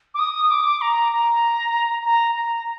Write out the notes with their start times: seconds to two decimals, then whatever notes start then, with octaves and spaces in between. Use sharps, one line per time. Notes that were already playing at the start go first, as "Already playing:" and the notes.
0.14 D6
0.19 D#6
0.50 D6
0.81 A#5
1.12 A#5
2.04 A#5
2.35 A#5